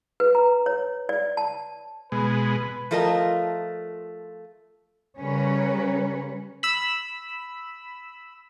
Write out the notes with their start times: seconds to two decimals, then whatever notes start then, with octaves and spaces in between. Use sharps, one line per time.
0.20 B4
0.35 A#5
0.66 C#5
1.09 D5
1.37 A5
2.12 B2 G#3 B4
2.91 F3 A3 F4 A#4 D#5 A5
5.19 C#3 G3 C#4 A#4 B4 C#5
6.63 B5 E6